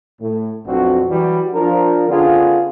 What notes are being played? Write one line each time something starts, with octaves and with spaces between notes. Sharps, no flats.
A2
B1 F2 C4 D4 F#4
E3 F#3 G3
F3 D4 A#4
D3 B3 C#4 D4 F4 G#4